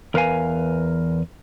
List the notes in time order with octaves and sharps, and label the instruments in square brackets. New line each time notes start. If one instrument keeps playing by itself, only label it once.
[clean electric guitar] E2 A#4 B4 D#5 F5 G#5